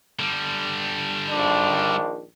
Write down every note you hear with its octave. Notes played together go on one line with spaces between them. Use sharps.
D3 G3
A#1 D#3 D4